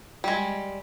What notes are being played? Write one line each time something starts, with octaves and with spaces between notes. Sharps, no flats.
G3 G#3